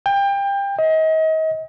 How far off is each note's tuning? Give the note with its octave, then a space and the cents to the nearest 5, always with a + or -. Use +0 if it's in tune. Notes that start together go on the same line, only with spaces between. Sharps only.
G5 +25
D#5 +35